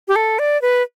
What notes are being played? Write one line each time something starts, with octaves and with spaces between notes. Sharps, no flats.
G4
A4
D5
B4